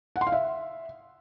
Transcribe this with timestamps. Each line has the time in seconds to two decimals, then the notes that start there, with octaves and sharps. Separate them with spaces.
0.16 F#5
0.21 C6
0.27 F5
0.32 E5